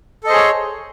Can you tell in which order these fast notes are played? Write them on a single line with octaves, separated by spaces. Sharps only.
A4 D#5 C5 G#4 C#5